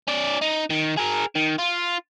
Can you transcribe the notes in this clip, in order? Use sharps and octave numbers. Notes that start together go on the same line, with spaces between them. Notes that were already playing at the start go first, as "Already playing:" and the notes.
C#4 D5
D#4
D#3
G#4 A#4
D#3
F4